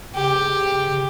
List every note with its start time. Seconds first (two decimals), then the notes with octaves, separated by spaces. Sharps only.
0.15 C#3 G4